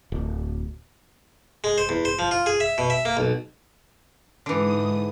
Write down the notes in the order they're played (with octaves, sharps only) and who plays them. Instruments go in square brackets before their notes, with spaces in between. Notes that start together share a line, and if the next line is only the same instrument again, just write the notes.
[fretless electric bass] D1
[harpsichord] G#3
C5
E2
C5
F3
F4
G#4
E5
B2
E5
A#3
B1
[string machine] G#2 D#6 [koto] D3 E3